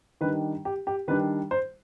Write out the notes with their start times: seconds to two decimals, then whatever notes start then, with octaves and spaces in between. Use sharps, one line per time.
0.21 D#3 G3 D4 B4
0.65 G4
0.87 G4
1.08 D#3 G3 D4 B4
1.51 C5